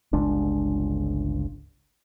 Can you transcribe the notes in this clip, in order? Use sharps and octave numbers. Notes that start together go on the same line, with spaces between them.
G1 C#2 G#3 D4